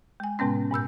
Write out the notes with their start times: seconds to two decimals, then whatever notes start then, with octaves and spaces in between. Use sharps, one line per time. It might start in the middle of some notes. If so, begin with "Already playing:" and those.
0.20 G#3 G#5
0.39 A2 C3 G#3 B3 C#4
0.71 G#2 B2 E6 G6